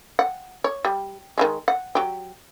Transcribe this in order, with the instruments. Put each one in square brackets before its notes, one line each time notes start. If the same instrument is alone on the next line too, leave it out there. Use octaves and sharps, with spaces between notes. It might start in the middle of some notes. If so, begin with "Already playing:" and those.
[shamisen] F#5
C#5
G3
D#3 G3 G#3
F#5
F#3 G4